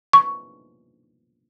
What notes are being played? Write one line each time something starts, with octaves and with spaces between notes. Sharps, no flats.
C#6